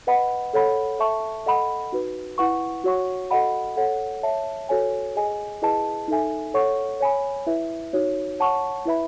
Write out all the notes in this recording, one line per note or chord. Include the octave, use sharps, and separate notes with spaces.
B4 D#5 F#5 B5
A4 C#5 F#5 B5
A4 E5 A5 C#6
A4 D#5 F#5 B5
D#4 F#4 B4
E4 B4 F#5 C#6
F#4 C#5 F#5 C#6
F#4 A4 D#5 F#5 B5
A4 C#5 F#5
C#5 E5 A5
F#4 A4 C#5 G#5
G#4 D#5 G#5
E4 G#4 B4 D#5 A5
D#4 A4 E5 G#5
A4 C#5 F#5 C#6
C#5 G#5 B5
E4 B4 E5
D#4 F#4 C#5
C#5 F#5 A5 C#6
E4 B4 E5 B5